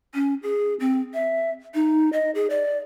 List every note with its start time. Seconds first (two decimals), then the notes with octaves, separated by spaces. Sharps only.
0.14 C#4
0.43 G#4
0.80 C4
1.14 E5
1.74 D#4
2.13 D#5
2.35 G#4
2.50 D5